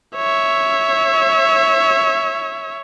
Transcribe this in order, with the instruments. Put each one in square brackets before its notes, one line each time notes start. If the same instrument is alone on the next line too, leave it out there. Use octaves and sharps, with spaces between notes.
[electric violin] C#5 E5